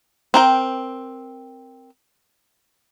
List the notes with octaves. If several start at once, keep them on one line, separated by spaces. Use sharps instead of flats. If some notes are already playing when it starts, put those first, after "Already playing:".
C4 A#4 G5